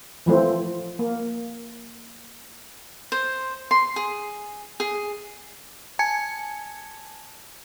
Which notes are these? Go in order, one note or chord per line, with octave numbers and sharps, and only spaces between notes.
E3 F3 A3 C4
A#3
C5
C6
G#4
G#4
G#5 A5 G#6 C#7